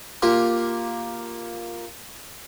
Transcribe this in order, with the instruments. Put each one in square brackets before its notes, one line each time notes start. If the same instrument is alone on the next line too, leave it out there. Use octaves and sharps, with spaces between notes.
[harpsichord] A#3 F4 G4